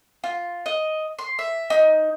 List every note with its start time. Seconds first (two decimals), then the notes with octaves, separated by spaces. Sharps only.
0.24 F4
0.66 D#5
1.19 C6
1.39 E5
1.70 D#4